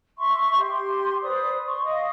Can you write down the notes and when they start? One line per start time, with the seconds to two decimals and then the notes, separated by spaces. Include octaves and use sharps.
0.18 E5 C6 C#6
0.58 G4 C6
1.22 B4 C5 D5 D#6
1.67 C6 C#6
1.83 D#5 F5 C#6 D#6